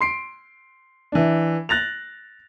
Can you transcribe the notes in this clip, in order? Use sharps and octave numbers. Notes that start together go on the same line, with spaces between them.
C6 C7 D7
E3 D4
F#6 A6 A#6 F7